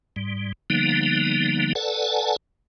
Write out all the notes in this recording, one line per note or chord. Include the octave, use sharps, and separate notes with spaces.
G#2 G3
D3 F3 G3 A#3 B3 D#4
A4 B4 D5 F#5 G#5 A5